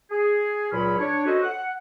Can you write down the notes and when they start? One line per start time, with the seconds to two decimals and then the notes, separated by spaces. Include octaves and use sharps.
0.11 G#4
0.71 C#2 A#2 F#3 C#4 B5
0.99 D4 C#5
1.26 C#4 F#4 A4 B4 C5 D#5
1.43 F#5